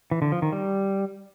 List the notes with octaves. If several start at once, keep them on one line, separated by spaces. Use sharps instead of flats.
E3
D3
F3
D#3
G3